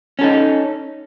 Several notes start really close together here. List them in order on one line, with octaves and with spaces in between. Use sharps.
C#4 A4 D#4